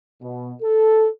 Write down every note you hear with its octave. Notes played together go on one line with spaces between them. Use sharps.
B2
A4